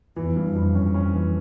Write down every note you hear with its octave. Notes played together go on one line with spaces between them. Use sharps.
E2 E3
G2
F2
G2
F2 C#4
C#4
E3